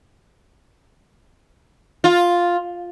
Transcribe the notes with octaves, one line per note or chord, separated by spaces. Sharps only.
F4